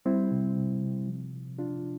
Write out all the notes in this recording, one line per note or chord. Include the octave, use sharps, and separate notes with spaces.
G3 C4 E4
C3
C3
C3
F3
F3
F3 D4 F4